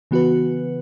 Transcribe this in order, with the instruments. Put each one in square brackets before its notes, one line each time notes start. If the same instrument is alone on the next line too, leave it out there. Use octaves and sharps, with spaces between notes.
[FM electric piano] C#3 E3 B3 F#4 B4